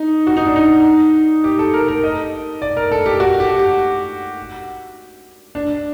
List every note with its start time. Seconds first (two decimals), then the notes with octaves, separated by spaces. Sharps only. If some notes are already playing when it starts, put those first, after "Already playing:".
Already playing: D#4
0.27 F#4
0.37 D#4
0.47 D4
0.56 D#4
1.44 G4
1.59 A4
1.74 A#4
1.88 A#4
2.04 D#5
2.62 D5
2.77 A#4
2.92 A4
3.06 G4
3.20 F#4
3.40 G4
3.59 G4
5.55 D4